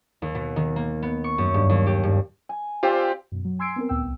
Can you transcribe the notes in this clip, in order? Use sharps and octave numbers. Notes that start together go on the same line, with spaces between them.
D#2
B2
D#3
A#3
B3
C#6
F#2
G2
D#2
G4
G2
G#5
C4 F4 G4 C5 D5
F#2 B2
F#3
G#5 C6 E6 G#6 C7 D7
B3 C4 A#4
D2 A#2 B3 G5 E6
C2